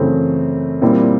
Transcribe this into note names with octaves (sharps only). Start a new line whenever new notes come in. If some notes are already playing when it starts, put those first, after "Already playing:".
Already playing: F#2 C#3 E3 A3 C4
A#2 G3 C4 E4